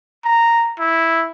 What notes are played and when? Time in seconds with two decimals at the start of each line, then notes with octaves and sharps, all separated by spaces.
0.25 A#5
0.79 E4